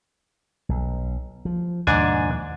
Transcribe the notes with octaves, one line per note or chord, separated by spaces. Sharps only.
B1
F3
D#2 G#2 B2 F3 D4 G#5